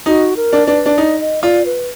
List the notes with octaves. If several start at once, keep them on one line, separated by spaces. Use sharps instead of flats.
D#4 F#4
A#4
D4
D4 B4
D4
D#4 D5
D#5
F4 D5
B4